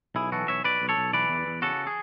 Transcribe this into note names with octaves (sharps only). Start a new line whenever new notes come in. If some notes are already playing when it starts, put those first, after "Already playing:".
B1 E4 G#4
E3 F#4 A4
B1 C#5 E5
B1 B4 D5
B1
A4 C#5
B1
E3 B4 D5
E2
E2
C#3 F#4 A4
G#4